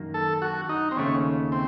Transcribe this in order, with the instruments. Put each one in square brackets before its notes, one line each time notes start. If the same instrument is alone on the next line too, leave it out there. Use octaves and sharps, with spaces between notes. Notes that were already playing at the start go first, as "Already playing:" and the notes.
Already playing: [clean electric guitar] F#2 D#3 A#3 D#4
[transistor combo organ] A4
F#4
D#4
C4
[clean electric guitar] D#2 C#3 A3 [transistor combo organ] C#4
[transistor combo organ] C4